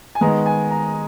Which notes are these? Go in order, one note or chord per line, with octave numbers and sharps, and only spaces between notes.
G#5
D#3 G#3 B3 A#5
G#5
A#5